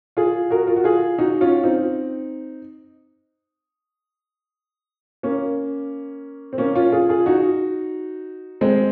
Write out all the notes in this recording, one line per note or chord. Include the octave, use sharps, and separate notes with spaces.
F4 G#4
F#4 A#4
F4
F#4
F4 G#4
D#4 F#4
C#4 F4
C4 D#4
A#3 C#4
C4
A#3 C#4
C#4 F4
F4 G#4
F4 G#4
D#4 F#4
G#3 C4